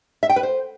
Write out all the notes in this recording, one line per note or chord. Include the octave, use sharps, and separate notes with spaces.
E5
G5
B4
C5